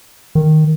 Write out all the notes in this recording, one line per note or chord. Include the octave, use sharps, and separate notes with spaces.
D#3